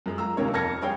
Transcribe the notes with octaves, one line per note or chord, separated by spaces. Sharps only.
F#2 G#3
F5 A#5 E6
D#2 C3 A#3 A#4 C#5
F2 A5 F6 G#6 A#6 C#7
G3 D4 G#4 C#5 F5 G5